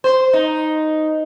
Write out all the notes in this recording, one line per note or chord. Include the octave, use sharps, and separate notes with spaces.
C5
D#4